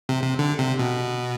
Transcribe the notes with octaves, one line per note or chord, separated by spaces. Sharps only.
C3
C3
D3
C3
B2